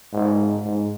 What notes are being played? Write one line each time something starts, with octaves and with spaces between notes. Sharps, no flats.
G#2
G#2